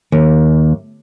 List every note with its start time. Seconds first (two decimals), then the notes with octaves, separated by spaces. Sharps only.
0.12 D#2